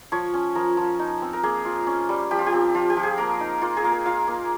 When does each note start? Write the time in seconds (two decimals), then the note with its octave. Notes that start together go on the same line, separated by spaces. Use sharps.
0.12 F3 C#5
0.34 C#4
0.55 F3 A#4
0.77 F3
0.99 D#4
1.22 C4
1.33 A#4
1.43 A#3 G#4
1.65 F4
1.87 C#4
2.09 G3
2.31 F3 G4
2.39 F4
2.46 G4
2.53 C4
2.74 F3 F4
2.90 G4
2.97 F3
3.03 G#4
3.18 A#3 A#4
3.40 D#4
3.61 A#3 F4
3.77 G#4
3.84 A#3
3.92 A#4
4.06 F4 F5
4.27 A#3